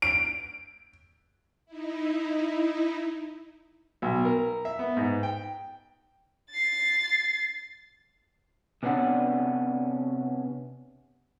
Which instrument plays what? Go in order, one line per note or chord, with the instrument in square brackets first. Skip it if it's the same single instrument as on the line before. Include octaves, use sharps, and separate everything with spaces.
[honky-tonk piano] D7
[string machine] D#4 E4
[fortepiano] B1
A#4
E5
B3
G#2
G5
[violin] A6 C7
[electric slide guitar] C3 B3 C#4 D4 F#5